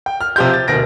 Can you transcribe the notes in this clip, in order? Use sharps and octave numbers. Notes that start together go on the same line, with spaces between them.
G5
F6
C3 F3 G4 C6 G6
A6
D2 B2 A#4 A#6 D7